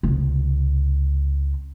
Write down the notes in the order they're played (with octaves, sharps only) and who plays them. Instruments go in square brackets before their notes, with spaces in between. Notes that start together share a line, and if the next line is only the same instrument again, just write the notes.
[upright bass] C#2 C3